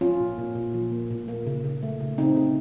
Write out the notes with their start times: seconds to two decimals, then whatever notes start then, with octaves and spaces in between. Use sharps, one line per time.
0.01 F3 C#4 F4
0.20 A#2
0.38 A#2
0.55 A#2
0.74 F3
0.92 A#3
1.11 A#2
1.28 A#3
1.47 C#3
1.64 C#3
1.82 A3
2.00 C#3
2.18 C#3 C4 D#4
2.37 C#3